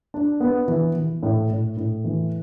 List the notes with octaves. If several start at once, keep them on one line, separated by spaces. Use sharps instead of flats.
D4
B3
E3
E3
A2
A2
A2
E3